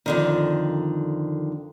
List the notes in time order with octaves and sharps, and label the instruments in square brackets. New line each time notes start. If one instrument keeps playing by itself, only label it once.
[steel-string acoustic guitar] F2 D3 D#3